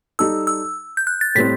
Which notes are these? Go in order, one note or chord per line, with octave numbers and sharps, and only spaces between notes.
G3 D#4 A4 E6
E6
G6
F#6
A6
A2 G3 C4 B6